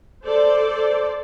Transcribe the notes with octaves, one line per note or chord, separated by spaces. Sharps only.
A4 C5 D5